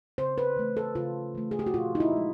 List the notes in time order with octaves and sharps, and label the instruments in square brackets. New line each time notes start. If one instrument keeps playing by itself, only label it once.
[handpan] C#3 C5
B4
E3 A3
A4
C#3 F4
E3 A3
G#4
G4
F#4
A#2 F4
D#4
E4
F3 G#3